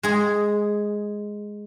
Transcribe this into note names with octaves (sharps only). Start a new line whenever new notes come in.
G#3 G#4